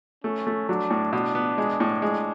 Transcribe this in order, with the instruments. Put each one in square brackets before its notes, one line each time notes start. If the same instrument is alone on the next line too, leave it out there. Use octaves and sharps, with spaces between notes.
[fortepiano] A3 [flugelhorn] C#4
[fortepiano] A3
[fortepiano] F#3 [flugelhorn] D4
[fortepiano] A2
[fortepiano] B2 [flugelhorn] D4
[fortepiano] B3
G#3
A2
G#3